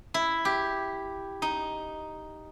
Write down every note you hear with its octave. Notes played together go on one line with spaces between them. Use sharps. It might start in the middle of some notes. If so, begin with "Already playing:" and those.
E4
G4
D#4